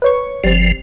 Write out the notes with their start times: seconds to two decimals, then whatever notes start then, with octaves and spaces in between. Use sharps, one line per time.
0.02 B4 C#5 C#6
0.44 G1 F3 G3 C4